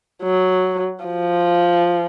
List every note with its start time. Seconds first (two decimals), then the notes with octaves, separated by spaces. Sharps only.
0.23 F#3
1.04 F3